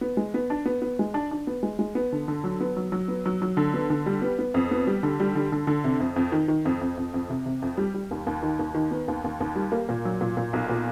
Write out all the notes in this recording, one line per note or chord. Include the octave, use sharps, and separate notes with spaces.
B3
G#3
B3
D4
B3
B3
G#3
D4
D4
B3
G#3
G#3
B3
D3
D3
F#3
B3
F#3
F#3
B3
F#3
F#3
D3
B3
D3
G3
B3
B3
F2
B3
G3
D3
G3
D3
D3
D3
C3
F2
F2
D#3
D#3
F2
F2
F2
F2
C3
C3
F2
G3
G3
D#2
D#2
D#3
D#2
D#3
B3
D#2
D#2
D#2
G3
A#3
A#2
F#3
A#2
A#2
B1
A#2